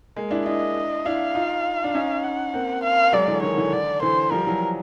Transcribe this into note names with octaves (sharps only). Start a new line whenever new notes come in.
G#3 A#3
D4 E4
D4 E4 D#5
D4 E4 F5
D#4 F4
D4
C#4 D#4
F#5
A#3 C4
F5
F#3 G#3 D5
D3 E3
D#3 C#5
D3 E3
D3 D5
D3 E3 C5
F3 G3 A#4
E3 F#3